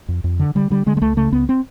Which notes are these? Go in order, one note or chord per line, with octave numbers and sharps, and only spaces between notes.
F2
F2
D3
D3 G3
D3 G3
D3 G#3
G#3
C#2 A3
C#3 A3
C#2 B3
C4